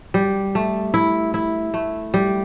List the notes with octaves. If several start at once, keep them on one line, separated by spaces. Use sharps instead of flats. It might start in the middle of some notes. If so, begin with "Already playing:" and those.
G3
A3
E4
E4
A3
G3